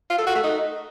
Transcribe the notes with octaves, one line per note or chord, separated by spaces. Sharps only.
F4
A4
F#4
A3
D#4